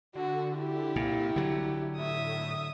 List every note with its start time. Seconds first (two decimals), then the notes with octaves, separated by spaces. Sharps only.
0.15 D3 F#4
0.56 E4 G4
0.96 C2 A#2
1.36 D3 F#3
1.99 A2 E5 D#6